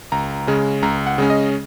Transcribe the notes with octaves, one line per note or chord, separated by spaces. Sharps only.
C#2 A#5
C#3 G#3 C#4
C#2 A#5
F#5
C#3 G#3 C#4
D#5